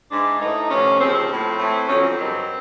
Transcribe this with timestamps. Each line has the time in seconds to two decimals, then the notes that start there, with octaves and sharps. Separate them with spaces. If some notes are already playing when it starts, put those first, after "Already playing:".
0.11 G#2 E3 D4
0.41 A2 E3 D#4
0.70 D2 C3 F3 C#4
1.00 D#2 C#3 F3 C4
1.15 C4
1.30 A2 F3
1.59 A2 E3
1.88 F2 D3 F#3 C#4
2.03 C4
2.18 G2 D#3 F#3